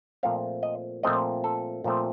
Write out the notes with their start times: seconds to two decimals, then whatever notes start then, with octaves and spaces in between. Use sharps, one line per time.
0.23 A#2 F3 A3 C4 F5
0.63 D#5
1.03 A#2 F3 A3 C4 D#5
1.44 A4
1.84 A#2 F3 A3 C4